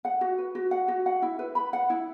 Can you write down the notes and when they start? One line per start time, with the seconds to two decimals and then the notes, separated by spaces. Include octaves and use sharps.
0.05 F#5
0.21 F#4
0.38 B4
0.55 F#4
0.71 F#5
0.88 F#4
1.06 F#5
1.22 E4
1.39 B4
1.55 B5
1.73 F#5
1.90 E4